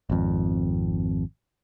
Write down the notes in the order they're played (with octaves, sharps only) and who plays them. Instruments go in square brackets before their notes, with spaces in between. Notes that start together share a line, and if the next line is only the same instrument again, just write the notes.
[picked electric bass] G#1 F2